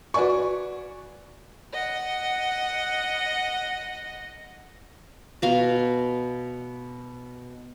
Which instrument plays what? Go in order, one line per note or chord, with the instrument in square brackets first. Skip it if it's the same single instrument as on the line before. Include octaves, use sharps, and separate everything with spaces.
[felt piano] F#4 B4 D5 G#5 C#6
[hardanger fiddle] D#5 F#5
[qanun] B2 F5 A#5